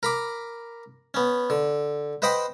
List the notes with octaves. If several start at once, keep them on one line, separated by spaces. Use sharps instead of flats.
A#4 B5 D6
B3 C#4
D3
B4 C5 D#5 F#5 G5 B5